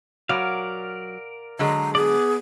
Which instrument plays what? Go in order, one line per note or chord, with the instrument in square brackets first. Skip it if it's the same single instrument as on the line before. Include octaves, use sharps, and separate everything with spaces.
[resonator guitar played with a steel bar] F#3 [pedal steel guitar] A#4 D5 F5
[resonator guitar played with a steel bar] D3 F#3 G#3 [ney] A#5
[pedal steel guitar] B3 D5 [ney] G#4